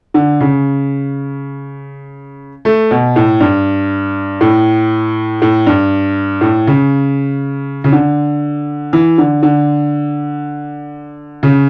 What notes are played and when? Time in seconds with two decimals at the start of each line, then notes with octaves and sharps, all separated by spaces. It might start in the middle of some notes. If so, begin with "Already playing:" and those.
0.14 D3
0.40 C#3
2.65 A3
2.91 B2
3.16 A2
3.40 G2
4.41 A2
5.42 A2
5.67 G2
6.41 A2
6.67 C#3
7.84 C#3
7.92 D3
8.93 E3
9.18 D3
9.43 D3
11.43 C#3